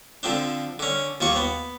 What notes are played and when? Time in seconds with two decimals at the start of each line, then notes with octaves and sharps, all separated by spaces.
0.23 D3 F3 C4 D4
0.79 D3 C#4
1.21 D#2 F3 A#3 C#6
1.36 B3